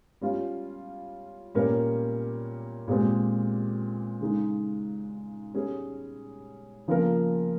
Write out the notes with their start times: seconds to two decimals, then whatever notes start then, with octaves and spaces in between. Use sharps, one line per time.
0.21 G3 C#4 F4
1.55 A#2 G3 C#4 G4 A#4
2.88 A#2 G#3 C4 G4
4.21 C#3 G#3 D#4
5.54 G3 C#4 G#4
6.88 C#3 F3 A#3 F4 A#4